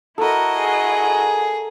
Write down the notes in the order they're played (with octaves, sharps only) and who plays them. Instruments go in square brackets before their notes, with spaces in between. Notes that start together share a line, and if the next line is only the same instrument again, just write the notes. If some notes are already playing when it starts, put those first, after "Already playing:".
[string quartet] E4 F#4 D#5 [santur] A4 A#4
[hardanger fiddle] G#4